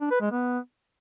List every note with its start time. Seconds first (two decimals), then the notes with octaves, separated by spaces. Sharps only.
0.01 D4
0.11 B4
0.21 G#3
0.31 B3